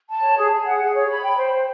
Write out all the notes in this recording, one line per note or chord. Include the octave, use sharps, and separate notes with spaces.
A5
C#5
G#4
G#4
F#5
G#4
C#5
B5
G5
C5
C5